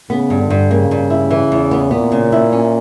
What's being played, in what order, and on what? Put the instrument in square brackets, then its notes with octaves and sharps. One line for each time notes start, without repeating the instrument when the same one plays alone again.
[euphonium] C#3 [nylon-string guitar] B3
[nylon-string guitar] G2
[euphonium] D3
[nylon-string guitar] G2
[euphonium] C#3 [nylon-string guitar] A#3
[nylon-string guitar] G2
E4
E3
E2
B3
[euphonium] A#2 [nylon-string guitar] B3
[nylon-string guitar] C#3
E4
C#4